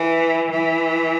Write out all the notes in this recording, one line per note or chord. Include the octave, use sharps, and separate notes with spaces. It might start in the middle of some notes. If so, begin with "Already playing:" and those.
Already playing: E3
E3